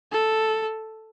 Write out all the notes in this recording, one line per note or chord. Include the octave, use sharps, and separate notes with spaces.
A4